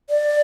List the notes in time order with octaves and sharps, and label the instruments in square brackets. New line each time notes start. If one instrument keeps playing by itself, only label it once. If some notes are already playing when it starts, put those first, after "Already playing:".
[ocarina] D5